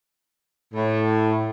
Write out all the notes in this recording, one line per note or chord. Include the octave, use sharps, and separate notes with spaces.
A2